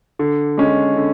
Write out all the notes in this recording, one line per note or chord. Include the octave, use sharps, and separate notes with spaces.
D3
G#3 C#4
D3